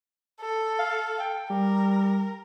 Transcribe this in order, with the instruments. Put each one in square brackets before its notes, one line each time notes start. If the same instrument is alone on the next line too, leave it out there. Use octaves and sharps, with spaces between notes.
[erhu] A4
[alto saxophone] F5
G5
[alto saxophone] G3 [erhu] A#4